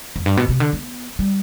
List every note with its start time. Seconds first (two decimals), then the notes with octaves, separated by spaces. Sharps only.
0.16 F2
0.26 G2
0.37 B2
0.49 C3
0.60 D3
0.73 B3
1.19 G3